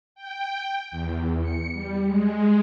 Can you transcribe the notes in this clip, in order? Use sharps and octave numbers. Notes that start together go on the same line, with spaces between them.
G5
E2
C#7
G3
G#3